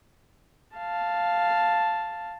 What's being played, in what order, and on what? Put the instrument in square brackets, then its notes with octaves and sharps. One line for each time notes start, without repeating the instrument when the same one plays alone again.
[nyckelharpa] F5 A5